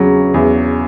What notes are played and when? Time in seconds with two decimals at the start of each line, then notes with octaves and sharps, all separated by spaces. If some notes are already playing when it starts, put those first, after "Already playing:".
Already playing: E2 C#3 F#3
0.34 E2